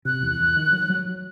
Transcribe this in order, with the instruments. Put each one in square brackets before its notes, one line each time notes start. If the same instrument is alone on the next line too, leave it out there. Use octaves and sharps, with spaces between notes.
[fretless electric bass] C3 [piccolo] F#6
[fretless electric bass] E2
E2
D#3
F#3
F#3